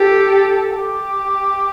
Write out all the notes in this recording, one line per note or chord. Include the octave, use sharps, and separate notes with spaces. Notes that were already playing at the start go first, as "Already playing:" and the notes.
Already playing: G4 A4
G4